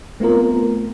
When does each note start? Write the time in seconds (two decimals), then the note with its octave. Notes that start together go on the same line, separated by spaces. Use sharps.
0.20 A3 B3 C4 F4 A#4